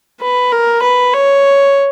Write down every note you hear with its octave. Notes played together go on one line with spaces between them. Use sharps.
B4
A#4
B4
C#5